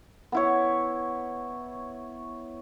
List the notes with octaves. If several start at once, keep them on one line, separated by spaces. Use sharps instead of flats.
B3 E4 C#5